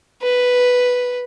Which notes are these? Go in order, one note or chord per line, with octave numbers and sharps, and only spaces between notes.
B4